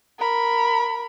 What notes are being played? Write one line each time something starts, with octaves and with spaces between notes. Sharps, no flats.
A#4 B5